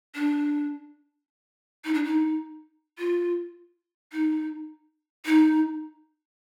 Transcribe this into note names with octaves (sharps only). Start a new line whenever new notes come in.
D4
D#4
D4
D#4
F4
D#4
D#4